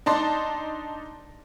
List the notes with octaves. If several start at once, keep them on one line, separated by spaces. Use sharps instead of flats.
D4 D#4 A5 C6